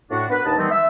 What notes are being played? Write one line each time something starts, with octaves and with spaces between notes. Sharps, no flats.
A2 D4 F#4
B3 D4 A#4 B4
D#2 D#4 B4 D#5 A5
D#3 E3 G3 A3 B3 C4
E5